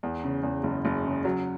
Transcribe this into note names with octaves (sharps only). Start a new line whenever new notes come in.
E2
C#3
E2
F#1
F#1
C#3
F#3